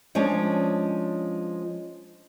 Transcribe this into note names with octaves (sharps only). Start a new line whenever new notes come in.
F3 G#3 C#4 D4 C#5